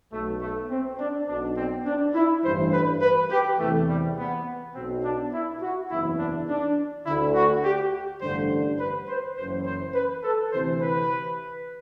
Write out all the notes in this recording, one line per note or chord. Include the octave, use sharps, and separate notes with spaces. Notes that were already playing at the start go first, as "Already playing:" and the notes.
B1 B2 A3
A3
C4
D4
B1 B2 D4
C4
D4
E4
A1 G2 E3 C5
B4
B4
G4
E2 C3 E3 A3
G3
B3
B1 B2 C4
D4
E4
F#4
F#1 E2 C3 E3 E4
D4
D4
D2 D3 E4
F#4
G4
A1 G2 D3 C5
B4
C5
F#1 F#2 E3 C5
C5
B4
A4
D2 C3 E3 C5
B4